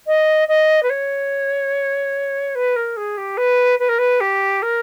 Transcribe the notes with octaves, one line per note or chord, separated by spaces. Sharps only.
D#5
D#5
B4
C#5
B4
A#4
G#4
G4
B4
B4
A#4
B4
G4
A#4